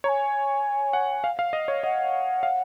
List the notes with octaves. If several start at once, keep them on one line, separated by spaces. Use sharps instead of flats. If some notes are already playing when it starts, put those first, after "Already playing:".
C#5 G#5 A#5
F#5
F5
F5
D#5
C#5
D#5 F#5
F5